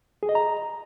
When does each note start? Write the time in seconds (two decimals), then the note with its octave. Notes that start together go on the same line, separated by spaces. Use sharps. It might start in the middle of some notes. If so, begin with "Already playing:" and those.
0.23 G#4
0.29 D#5
0.35 A#5